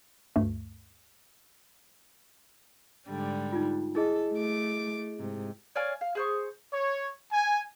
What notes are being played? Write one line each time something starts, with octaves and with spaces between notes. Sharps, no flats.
D2 G2 A3
G#2 D3 G3
D#4 F4
E4 G#4 A4 D#5
A3 D6
G#2 C3
C#5 D5 F5 G#5
F5
G#4 C5 C#6
C#5
G#5